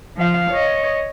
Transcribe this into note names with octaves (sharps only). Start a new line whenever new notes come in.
F3 F5
C#5 D#5